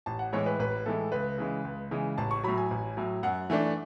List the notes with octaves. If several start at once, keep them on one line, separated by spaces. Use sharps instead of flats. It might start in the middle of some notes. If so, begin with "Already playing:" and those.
A1 A5
F#5
A2 E3 G#3 C#5
B4
A1 B4
A2 E3 G#3 A4
C#2 B4
C#3 E3 G#3
C#2
C#3 E3 G#3
A1 A5
C#6
A2 F#3 B5
G#5
A1
A2 F#3
F#2 F#5
E3 A3 D4